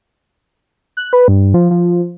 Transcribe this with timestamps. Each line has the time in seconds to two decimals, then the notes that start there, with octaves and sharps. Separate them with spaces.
0.97 F#6
1.13 B4
1.28 G2
1.54 F3
1.71 F3